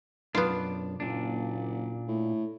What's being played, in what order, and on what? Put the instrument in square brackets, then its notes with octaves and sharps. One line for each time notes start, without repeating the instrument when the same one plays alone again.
[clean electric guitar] B1 F#2 D4 [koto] B3 F4
[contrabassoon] F#1 [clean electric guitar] A#2 D4
[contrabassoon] A2